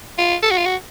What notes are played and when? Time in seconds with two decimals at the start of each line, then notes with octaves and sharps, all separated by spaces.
0.18 F4
0.43 A4
0.51 F#4
0.57 F4
0.65 F#4